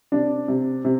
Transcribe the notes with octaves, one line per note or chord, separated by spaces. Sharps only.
C3 D4
C3
C3